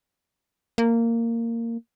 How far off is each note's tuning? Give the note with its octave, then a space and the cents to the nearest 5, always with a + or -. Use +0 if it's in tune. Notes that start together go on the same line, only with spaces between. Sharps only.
A#3 -15